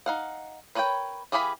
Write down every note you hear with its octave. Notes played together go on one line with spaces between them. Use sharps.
D#4 F5 F#5
A#4 B4 C#5 F#5 G5
E3 G4 G#4 F5 B5